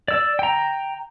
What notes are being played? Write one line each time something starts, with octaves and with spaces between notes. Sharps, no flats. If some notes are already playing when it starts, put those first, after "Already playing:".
D5 E6
G5 A#5